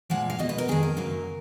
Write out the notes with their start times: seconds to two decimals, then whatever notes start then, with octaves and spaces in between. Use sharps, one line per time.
0.10 A#2 F3 G#3 F#5
0.30 F5
0.39 B2 G#3 D#5
0.49 B4
0.58 A#4
0.68 F2 D#3 G#3 G#4
0.83 A#4
0.97 F#2 C#3 F#3 A#3